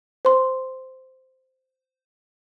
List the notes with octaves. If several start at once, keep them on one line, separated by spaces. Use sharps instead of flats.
C5 C6